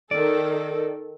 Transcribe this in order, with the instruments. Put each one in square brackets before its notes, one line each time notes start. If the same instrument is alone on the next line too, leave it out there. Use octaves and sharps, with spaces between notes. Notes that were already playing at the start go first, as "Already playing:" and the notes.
[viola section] D#3 A4 [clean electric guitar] D5